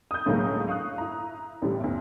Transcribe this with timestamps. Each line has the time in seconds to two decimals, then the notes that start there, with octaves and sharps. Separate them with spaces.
0.11 D#6 G6
0.26 C#2 A2 D3 F#3 G#3 A#3
0.68 F5 C#6 D#6 F#6
0.98 E4 A#5
1.62 A1 A2 D3 G3
1.80 G1 D2